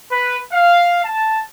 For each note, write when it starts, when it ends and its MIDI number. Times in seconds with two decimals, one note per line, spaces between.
0.11 0.36 71
0.52 1.01 77
1.04 1.40 81